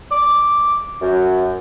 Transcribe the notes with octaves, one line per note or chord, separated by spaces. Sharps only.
D6
F#2